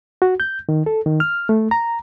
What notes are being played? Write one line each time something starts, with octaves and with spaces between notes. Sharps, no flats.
F#4
G6
D#3
A4
D#3
F6
A3
A#5